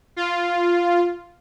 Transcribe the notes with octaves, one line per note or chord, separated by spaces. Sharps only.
F4